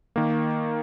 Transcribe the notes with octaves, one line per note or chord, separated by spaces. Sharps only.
D#3 A#3